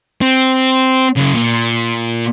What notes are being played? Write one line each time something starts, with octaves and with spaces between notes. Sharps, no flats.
C4
F#2 C#3
A#2